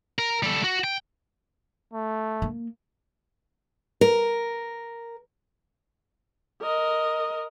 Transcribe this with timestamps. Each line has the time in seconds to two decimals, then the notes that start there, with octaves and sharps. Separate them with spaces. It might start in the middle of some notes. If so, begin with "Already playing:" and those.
0.19 A#4
0.43 G3 A4
0.64 F#4
0.84 G5
1.93 A3
2.42 A#3
4.01 A#4
6.62 A#4 D#5